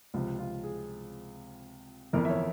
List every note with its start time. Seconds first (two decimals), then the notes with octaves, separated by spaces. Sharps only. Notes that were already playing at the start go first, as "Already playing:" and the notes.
0.14 C#2 C3 F3 F4
0.39 F4
0.64 G#4
2.13 G1 F2 E3 A#4
2.25 E5
2.30 C#5